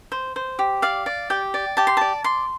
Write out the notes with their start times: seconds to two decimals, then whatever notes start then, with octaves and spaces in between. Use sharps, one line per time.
0.12 C5
0.36 C5
0.59 G4
0.82 D5 F5
1.06 D5
1.30 G4 G5
1.54 D5
1.77 G4 A5
1.87 C6
1.97 D5 A5
2.24 D5 C6